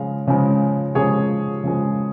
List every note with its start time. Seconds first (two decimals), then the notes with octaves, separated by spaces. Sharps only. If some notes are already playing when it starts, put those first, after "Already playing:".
Already playing: C#3 F3 G#3 F5
0.27 C#3 F3 G#3
0.95 C#3 F3 G#3 G#4 C#5
1.64 C#3 F3 G#3